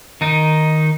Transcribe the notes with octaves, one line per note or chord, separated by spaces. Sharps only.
D#3 D#4